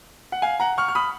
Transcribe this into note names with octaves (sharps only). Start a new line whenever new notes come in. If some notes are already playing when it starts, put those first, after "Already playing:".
F#5
F5 G#5
F#5 A#5
C#6 F6
F6
B5 D#6